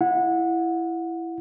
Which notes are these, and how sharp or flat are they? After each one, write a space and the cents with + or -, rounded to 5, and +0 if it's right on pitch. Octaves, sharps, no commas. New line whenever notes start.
E4 +10 F#5 -20